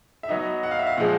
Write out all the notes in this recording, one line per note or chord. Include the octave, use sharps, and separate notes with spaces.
E5
F#3 B3 D#4 D#5
F#5
F5
E5
F5
A#2 F3 G#3 F#5